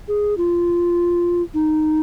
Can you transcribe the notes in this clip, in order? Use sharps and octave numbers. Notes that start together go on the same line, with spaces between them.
G#4
F4
D#4